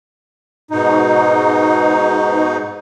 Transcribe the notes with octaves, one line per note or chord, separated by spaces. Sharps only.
G#2 B2 D#4